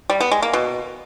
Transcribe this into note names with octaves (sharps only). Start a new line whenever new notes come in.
G3
B3
G#3
A#3
B2